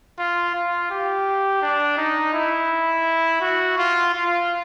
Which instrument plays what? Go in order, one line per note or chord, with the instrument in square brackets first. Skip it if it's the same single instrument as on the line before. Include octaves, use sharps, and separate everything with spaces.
[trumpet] F4
F4
G4
D4
D#4
E4
F#4
F4
F4